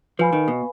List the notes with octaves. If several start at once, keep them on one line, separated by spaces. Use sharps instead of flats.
F3 B4 F5 G#5 B5
D#3
B2